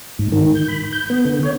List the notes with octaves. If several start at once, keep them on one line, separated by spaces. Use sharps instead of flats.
G#2
D#3
G6
B5
G6
B3
D3
C#5